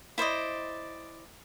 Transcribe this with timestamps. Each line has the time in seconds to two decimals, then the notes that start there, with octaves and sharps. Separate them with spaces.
0.18 E4 C5 D5 D#5